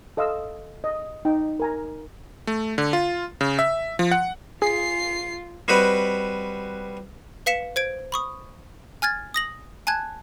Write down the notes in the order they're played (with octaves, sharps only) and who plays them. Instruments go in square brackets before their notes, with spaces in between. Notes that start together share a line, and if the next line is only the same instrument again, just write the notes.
[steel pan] A4 D#5 F5 C6 E6
D#5
D#4 G5
A#4 G#5 A#5
[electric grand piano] A3
D3
F4
C#3
E5
F3
F#5
[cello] F4 [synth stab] G#4 [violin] C7
[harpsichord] G3 C4 F#4 B4 D#5 F#5
[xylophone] B4 F5 B6 C#7 E7
C5 G#6 D7
B5 C#6 D#6
G#5 F6 G#6 A6
D#6 A#6 F#7
G#5 A5 F#6 G#6